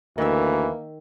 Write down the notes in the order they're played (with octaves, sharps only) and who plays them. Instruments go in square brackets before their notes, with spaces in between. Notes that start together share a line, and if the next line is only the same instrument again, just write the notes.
[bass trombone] D2 [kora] D#3 E5 [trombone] E3 [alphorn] A#3